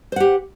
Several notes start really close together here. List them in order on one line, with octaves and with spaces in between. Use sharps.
C5 F#5 G4